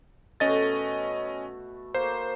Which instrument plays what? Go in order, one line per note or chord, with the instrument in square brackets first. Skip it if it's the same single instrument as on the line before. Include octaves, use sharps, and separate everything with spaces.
[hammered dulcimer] B2 A3 [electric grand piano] C#4 D#5 A6
[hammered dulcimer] A#3 C#5 [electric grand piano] C5